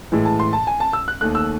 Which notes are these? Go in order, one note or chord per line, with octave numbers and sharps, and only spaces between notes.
A2 E3 G#3
A5
C6
A5
G#5
A5
E6
F#6
D#2 D#3 A3 F#6
E6